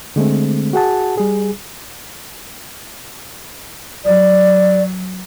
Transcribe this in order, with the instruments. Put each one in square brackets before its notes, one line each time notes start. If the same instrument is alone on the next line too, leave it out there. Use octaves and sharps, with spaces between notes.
[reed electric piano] D3 G#3 A3 C4
F#4 G#4 F#5 A5
G3 G#4
[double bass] F#3 [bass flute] D5